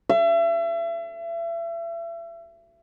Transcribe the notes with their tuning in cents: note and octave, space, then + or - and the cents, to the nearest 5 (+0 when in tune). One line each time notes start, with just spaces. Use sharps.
E5 +35